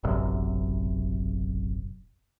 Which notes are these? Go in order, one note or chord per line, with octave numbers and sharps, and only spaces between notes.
E1 A1 F#2 C3